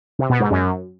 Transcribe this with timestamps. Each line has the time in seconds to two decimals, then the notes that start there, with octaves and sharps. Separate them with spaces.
0.19 C3
0.29 B2
0.40 G#2
0.51 F#2